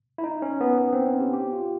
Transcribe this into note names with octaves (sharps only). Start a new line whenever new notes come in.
E4
D#4
C#4
B3
B3
C4
C#4
G4
G4
F4